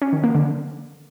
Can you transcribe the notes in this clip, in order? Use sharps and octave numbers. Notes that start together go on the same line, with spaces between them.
C#4
D#3
A#3
D3